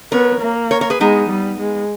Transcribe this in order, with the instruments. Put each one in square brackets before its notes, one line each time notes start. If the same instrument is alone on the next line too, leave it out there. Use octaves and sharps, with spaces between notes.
[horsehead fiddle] B3 [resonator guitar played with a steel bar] A#4 C#5
[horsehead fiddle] A#3
[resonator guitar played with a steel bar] A#4 C#5
A#4 C#5
G#4 B4
[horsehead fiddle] G#3 [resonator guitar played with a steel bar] B3 D#4
[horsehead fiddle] G3
G#3